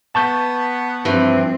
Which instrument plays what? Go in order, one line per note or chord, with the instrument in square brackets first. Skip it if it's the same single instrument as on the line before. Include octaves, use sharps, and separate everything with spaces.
[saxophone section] B3 [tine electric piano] A5 C#6 G6
[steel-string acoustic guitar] G2 E3 [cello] F3 C4